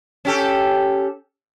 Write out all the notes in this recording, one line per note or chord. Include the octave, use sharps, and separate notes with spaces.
C#4 G4 A4